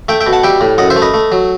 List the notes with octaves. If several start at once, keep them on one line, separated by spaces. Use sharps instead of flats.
A3 E5 G5
E5 G5
B2
F#5 A5
G3 E5 G5
A2
F#2 D#5 F#5
C5 E5
A3
B4 D#5
A3
F#3